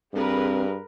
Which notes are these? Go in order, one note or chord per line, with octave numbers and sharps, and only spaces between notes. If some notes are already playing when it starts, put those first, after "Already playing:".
G2 C4 G#4 A#4 B4